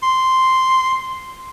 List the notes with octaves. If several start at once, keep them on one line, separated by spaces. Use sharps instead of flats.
C6